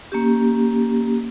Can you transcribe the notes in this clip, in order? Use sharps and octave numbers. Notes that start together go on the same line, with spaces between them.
A#3 C#4 G4